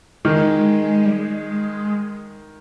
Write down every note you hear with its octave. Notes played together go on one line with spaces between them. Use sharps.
D#3 G#3
G3
G#3